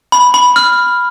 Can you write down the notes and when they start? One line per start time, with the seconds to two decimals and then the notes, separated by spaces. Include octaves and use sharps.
0.12 B5
0.34 B5
0.56 F6